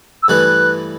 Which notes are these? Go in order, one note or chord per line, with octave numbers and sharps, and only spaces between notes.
E6
G2 E3 A3 E4 B4 F#6